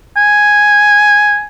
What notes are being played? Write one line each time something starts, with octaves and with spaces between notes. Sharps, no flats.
G#5